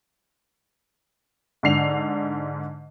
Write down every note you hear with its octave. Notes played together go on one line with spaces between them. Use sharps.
G#2 D3 C7 F7